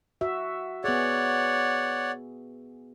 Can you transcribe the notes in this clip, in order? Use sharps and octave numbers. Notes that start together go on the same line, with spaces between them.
F#4 E5
B3 G#4 C#5 D5 F#5